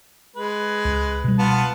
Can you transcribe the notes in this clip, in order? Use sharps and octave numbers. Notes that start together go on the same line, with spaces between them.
G#3 B4
C#2
B2 G3
B3 F4 A5